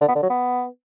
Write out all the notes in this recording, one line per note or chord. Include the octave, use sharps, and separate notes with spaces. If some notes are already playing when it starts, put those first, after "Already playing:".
D3
B3
D3
F#3
B3